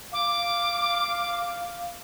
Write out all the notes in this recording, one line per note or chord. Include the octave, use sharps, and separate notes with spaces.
F5 D6